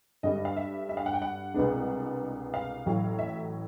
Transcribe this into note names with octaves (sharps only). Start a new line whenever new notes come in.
G2 D3 G3 D#5
F5
E5
E5
F5
F#5
G5
F#5
C2 B2 G#3 B3 D4
F5
A1 A2 F#3
E5